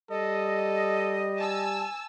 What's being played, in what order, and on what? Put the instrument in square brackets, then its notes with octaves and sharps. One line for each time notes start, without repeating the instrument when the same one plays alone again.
[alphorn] G3 [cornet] A4 [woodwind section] D#5
[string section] G#5 A5 E6